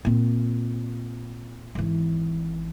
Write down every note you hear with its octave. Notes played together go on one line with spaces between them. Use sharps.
A#2 C4
G#1 E3